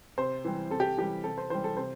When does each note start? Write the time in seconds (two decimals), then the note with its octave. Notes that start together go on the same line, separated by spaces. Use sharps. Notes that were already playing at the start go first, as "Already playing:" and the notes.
0.18 C3 C5
0.45 E3 G3
0.70 C3 A4
0.80 G4
0.98 E3 G3 G4
1.24 C3 A4
1.38 C5
1.50 E3 G3 C5
1.64 A4
1.77 C3 C5